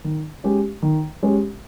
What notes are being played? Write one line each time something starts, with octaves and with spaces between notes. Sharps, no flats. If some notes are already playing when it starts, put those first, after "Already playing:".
D#3
G#3 C#4 G4
D#3
G#3 C#4 G4